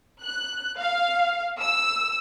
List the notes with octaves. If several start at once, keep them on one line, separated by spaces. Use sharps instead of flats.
F#6
F5
E6